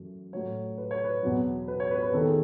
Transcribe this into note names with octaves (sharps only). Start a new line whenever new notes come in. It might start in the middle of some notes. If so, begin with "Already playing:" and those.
Already playing: F#2 E3 A3
A2 F#3 A3 C#5
B4
C#5
B4
E2 B2 F#3
B4
C#5
B4
B4
E2 D#3 A3 A4
G#4